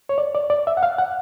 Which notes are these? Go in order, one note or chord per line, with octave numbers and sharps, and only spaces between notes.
C#5
D5
D5
D5
E5
F#5
F5
F#5